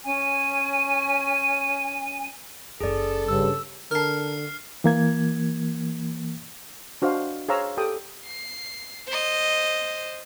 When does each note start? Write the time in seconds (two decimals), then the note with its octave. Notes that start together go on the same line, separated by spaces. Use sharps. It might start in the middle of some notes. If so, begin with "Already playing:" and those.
0.05 C#4 G#5
2.80 F#1 C#4 G#4 A4 D5
3.28 G2 C#3 E6
3.91 D3 A#4 A5 F6 C7
4.84 E3 A#3 G#6
7.02 D4 F#4 C5 D#5 F5
7.49 G#4 C5 C#5 F5 A#5 E6
7.77 G4 A4 G5 D#6
8.26 C7
9.07 C5 D#5